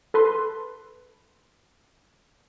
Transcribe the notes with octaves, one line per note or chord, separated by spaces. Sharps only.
A4 B4 C6